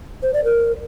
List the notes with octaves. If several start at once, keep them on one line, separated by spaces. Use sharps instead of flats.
C5
D5
A#4